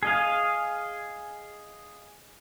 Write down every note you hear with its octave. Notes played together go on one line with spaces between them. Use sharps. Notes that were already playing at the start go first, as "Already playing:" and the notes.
G#4 D#5 F5